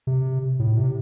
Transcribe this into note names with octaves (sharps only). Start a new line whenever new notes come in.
C3
A2
C3